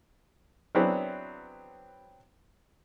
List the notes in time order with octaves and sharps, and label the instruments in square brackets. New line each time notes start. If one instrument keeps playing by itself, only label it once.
[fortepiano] F#3 B3 C4 D4 E4 G#4